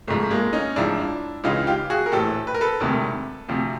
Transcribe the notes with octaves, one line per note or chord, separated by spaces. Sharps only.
G#1 G#2 F3 A3
G#3 A#3
C#4 D#4
A1 G#2 F3 D4 E4
C#2 C#3 E3 D#4 F4
F4 G4
F#4 G#4
A#4
A#1 A2 E3 G4 A4
B4
A#4
A4 B4
E1 D2 C3 D#3
D2 C3 F3